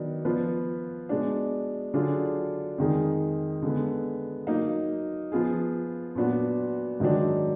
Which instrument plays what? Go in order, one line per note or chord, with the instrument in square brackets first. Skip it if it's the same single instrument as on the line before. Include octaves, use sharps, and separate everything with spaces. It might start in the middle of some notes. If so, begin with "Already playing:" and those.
Already playing: [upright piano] D#3 F#3 B3 D4
F3 B3 F4 B4
B2 G#3 D4
D3 F#3 D4 F4 G#4
F2 D#3 G#3 D#4 G#4
D3 G#3 B3
F#3 A#3 D#4
F3 B3 F4 G#4
A#2 F#3 B3 D4 F#4
G#2 D#3 F#3 D4